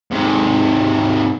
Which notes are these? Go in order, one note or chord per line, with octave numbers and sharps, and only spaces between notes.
G#2 C3